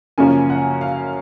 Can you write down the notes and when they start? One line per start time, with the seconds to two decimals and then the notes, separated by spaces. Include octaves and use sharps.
0.18 F#2 C#3 F3 A#3 C#4 G#5
0.50 F#5
0.81 F5